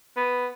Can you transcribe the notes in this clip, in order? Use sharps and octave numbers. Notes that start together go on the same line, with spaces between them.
B3